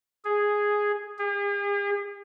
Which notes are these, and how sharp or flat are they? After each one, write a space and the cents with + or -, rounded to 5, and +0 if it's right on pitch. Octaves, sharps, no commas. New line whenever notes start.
G#4 +0
G#4 -45